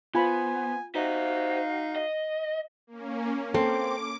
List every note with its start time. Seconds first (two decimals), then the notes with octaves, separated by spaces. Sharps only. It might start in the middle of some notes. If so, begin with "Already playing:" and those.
0.15 B3 F4 C5 G#5 B5
0.95 D#4 F#4 C5 E5 F5
1.96 D#5
2.87 A#3 C#4
3.54 C4 A4 D6